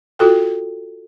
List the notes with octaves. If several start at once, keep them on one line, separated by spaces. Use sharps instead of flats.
F4 F#4 A4 G5